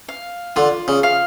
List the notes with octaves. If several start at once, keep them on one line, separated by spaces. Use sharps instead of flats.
F5
D3 F4
C#3
F5